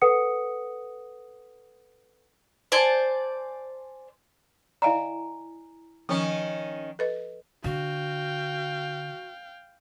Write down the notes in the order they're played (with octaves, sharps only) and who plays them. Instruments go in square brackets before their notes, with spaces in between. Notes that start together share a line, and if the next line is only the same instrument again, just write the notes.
[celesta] A4 B4 F#5 D#6 C#7
[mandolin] C5 D5 G#5 A5
[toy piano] E4 G#5 A#5 [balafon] D5 D#5 F5
[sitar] D#3 C#4 [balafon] F3
[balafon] A4 B4 D#5
[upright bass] D3 [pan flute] F#4 [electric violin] F5 G5